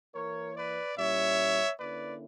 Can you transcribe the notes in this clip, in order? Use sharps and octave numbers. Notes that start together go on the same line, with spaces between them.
E3 A#3 E4 A#4 C#5
B4 D5
A#2 G3 C#4 E4 C#5 E5
D3 A#3 C#4 E4 B4 D5